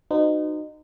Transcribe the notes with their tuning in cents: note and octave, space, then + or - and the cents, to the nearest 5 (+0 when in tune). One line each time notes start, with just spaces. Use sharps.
D#4 -25 F#4 +0 C5 -45